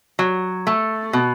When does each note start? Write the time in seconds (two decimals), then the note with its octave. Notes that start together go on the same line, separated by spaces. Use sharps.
0.19 F#3
0.67 A3
1.13 B2